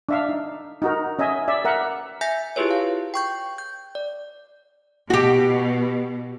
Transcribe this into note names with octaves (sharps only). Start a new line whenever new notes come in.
D4 E5 F5
D#4
D#4 F#4 A#4
C#4 D#5 E5 G#5
D5 E5
A#4 E5 F#5
E5 G#5 G6 A#6 B6
E4 F4 G4 G#4 B4 C#5
F5
G5 C#6 G6
G6
D5
B2 F#4 G4